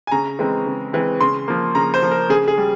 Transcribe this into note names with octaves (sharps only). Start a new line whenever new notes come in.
G#5
C#3 A#5
E3 G#3 C4
C#3
E3 G#3 C4
C#3 C6
F3 A#3
C#3 A#5
C5
F3 A#3
A#4
C#3 G#4
G#4
G3